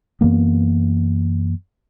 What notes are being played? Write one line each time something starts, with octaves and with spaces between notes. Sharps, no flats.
F#2 E3 A#3 B3